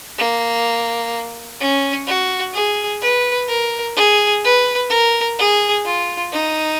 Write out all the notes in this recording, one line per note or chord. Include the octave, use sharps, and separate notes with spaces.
A#3
C#4
F#4
G#4
B4
A#4
G#4
B4
A#4
G#4
F4
D#4